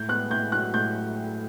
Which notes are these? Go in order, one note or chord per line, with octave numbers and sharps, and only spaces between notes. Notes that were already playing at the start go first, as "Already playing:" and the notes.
Already playing: A2 G6
B3 F#6
A2 G6
F#3 F#6
A2 G6